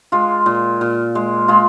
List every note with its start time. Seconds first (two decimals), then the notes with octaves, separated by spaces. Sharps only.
0.12 G#3 F4
0.46 A#2
0.81 A#2
1.15 G#3
1.48 G#3 F4